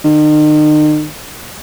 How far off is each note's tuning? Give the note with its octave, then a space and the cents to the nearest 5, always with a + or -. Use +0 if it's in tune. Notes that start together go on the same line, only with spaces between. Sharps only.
D#3 -40